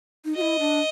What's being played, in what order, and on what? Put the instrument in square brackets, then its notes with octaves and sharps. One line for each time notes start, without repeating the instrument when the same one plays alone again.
[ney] D#4
[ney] F#4 [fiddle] D#5
[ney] E4
D4